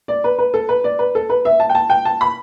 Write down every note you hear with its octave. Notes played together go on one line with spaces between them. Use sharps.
D5
B4
B4
A4
B4
D5
B4
A4
B4
E5
A5
G5
A5
G5
A5
B5